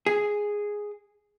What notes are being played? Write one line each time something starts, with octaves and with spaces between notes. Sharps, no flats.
G#4